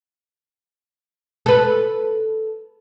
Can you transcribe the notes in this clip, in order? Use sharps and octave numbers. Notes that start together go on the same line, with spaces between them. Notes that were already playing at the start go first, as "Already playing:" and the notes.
A4 B4